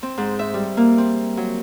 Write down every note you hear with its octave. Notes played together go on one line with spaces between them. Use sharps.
C4
G#2
E5
G3
A#3
C4
F#3